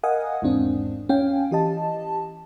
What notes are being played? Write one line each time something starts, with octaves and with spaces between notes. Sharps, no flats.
A#4 D#5 F5 F#5 G#5 D#6
G#1 E2 G#2 C4 D4
C#4 F5 G5 G#5
E3 G4 D#5 A5